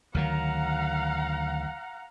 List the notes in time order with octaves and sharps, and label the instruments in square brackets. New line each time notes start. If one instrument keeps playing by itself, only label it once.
[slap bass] D2 D#3 F#3 [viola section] F5 F#5 A#5